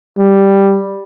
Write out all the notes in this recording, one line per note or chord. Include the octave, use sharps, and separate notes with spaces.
G3